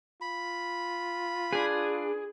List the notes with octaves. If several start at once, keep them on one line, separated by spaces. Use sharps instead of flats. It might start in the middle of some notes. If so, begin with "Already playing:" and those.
F4 B5
D4 G#4 B4